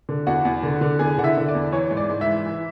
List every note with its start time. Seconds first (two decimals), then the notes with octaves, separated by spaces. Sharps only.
0.09 D3
0.27 E2 F#4 F#5
0.45 E2
0.63 D3
0.81 D3
0.99 E2 G#4 G#5
1.18 D3 F#5
1.24 E4 E5
1.37 D3
1.48 D5
1.55 E2
1.72 E3 C#5
1.91 G#2
1.97 D5
2.10 G#2
2.21 E4 E5
2.27 E3
2.46 E3